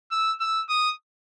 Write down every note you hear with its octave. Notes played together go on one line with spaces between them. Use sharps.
E6
E6
D#6